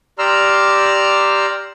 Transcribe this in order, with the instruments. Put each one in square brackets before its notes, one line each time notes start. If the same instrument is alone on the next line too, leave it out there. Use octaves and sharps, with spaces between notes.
[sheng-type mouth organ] G4 D5 A#5 C6 E6 F6